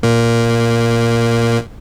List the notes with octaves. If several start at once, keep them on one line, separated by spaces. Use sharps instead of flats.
A#2 A#3